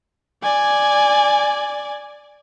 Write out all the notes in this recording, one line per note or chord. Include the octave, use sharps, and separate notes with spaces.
D5 G#5